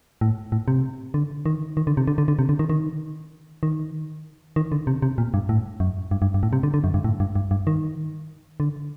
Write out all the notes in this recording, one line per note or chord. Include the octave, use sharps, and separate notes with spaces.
A2
A2
C3
D3
D#3
D#3
D3
C3
D3
D3
D3
C3
D3
D#3
D#3
D#3
D#3
D3
C3
C3
A#2
G2
A2
F#2
G2
G2
G2
A2
C3
D3
D3
F#2
G2
A2
G2
G2
G2
D#3
D3